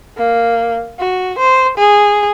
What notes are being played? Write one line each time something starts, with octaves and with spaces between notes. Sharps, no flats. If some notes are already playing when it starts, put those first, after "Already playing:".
A#3
F#4
C5
G#4